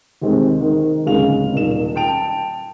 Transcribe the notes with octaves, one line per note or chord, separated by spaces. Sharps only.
D#2 G#3 C4
D#3
D1 C#3 G#3 C#4 F5 F7
D#1 D#3 E7
G5 A5 D7 F7